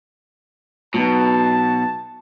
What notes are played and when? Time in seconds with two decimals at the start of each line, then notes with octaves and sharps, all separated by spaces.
0.94 B2 F#3 B3 D#4 A5